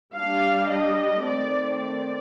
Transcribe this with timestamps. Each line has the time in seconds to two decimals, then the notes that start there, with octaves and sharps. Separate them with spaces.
0.14 G3 D4 F5
0.68 D#5
1.22 D#3 A3 C4 D5
1.76 D5